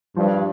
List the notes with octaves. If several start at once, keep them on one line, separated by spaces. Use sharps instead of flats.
G2 F3